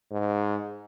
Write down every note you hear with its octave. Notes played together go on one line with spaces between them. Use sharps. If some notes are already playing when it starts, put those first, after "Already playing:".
G#2